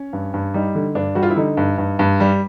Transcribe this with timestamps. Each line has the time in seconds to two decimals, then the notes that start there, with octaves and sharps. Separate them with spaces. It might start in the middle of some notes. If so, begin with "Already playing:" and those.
Already playing: C#4
0.13 G2
0.34 G2
0.54 G3 D#4
0.75 D3
0.95 G2 D4
1.15 G3 F#4
1.23 F4
1.30 E4
1.36 D3 D#4
1.57 G2
1.78 G2
1.99 G2
2.20 G3